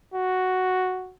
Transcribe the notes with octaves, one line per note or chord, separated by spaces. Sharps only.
F#4